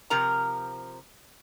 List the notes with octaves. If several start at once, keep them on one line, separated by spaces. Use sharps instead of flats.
C3 F3 A#4 A#5